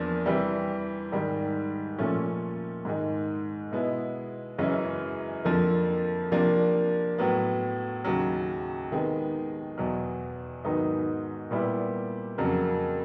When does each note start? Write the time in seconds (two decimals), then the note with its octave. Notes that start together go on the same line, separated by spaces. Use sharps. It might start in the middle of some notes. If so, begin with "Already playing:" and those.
Already playing: E2 F3 A#3 D4
0.26 C3 E3 G3
1.12 G#2 D#3 G3
1.98 A#2 F3 A3 C#4
2.85 G#2 D#3 G#3
3.72 B2 G#3 B3 E4
4.58 F#2 C#3 E3 G#3 C#4
5.45 F2 D3 F3 A#3
6.32 C3 F3 A#3 D4
7.18 A2 F#3 B3
8.04 D#2 C#3 F#3
8.91 C3 D#3 G#3 B3
9.78 E2 B2 F#3
10.64 G#2 D#3 F#3 B3 D#4
11.51 A#2 G3 B3 E4
12.38 F2 C#3 F#3 A#3